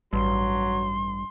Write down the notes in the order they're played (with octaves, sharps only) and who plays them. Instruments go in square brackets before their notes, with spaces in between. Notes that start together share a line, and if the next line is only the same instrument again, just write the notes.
[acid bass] A1 [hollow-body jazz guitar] G2 [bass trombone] F#3 [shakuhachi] C6